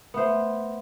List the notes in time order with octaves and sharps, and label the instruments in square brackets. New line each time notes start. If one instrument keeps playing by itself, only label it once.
[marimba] A3 E5 [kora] B3 C5